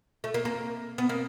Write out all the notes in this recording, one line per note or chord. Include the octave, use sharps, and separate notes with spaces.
A3
A#3
A#3
B3
A#3